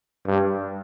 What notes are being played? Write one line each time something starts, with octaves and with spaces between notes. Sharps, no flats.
G2